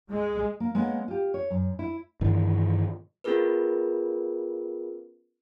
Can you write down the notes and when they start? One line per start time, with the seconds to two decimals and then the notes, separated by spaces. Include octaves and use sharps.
0.11 G#3
0.60 A#3
0.75 G#3 A#3 B3 C#4
1.08 F4 G4
1.34 C#5
1.50 F#2
1.79 E4
2.21 G2 D#3 E3
3.24 B3 C#4 F4 G#4 A#4 B4